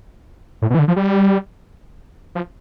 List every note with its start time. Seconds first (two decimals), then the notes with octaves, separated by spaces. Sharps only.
0.62 A2
0.70 B2
0.75 E3
0.79 D3
0.88 F3
0.96 G3
2.35 F3